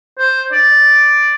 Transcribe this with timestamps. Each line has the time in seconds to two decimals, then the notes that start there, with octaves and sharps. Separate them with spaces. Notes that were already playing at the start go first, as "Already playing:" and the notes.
0.19 C5
0.52 D5